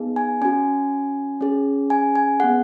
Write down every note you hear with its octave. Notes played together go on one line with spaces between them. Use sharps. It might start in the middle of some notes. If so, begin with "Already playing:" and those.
Already playing: B3 D#4 G#4
G#5
C#4 F#4 G#5
C#4 G#4
G#5
G#5
B3 G#4 F#5